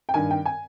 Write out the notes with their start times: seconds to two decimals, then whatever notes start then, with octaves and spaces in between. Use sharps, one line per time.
0.09 G5
0.14 G2 D#3 G#5
0.31 G5
0.46 G#5